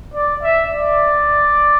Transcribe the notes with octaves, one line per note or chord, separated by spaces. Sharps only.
D5
E5
D5